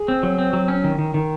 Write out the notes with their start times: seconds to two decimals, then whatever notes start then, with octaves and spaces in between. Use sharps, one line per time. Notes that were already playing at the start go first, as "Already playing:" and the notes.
Already playing: G#4
0.08 C4
0.23 F#3
0.39 C4
0.53 F#3
0.68 C#4
0.84 D#3
0.98 D#3
1.14 D#3